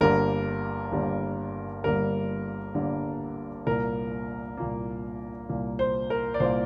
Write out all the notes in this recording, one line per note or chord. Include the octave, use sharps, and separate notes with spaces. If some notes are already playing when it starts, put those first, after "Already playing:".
G1 G2 D3 G3 A#3 A#4
G1 G2 D3 G3 A#3
G1 G2 D3 G3 A#3 A#4
G1 G2 D3 G3 A#3
C2 A#2 A#3 A#4
C2 A#2 A#3
C2 A#2 A#3
C5
A#4
D5
C2 A#2 A#3 C5